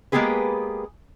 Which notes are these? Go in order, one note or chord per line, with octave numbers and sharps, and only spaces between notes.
G#3 A#3 B3 G4 G#4 B4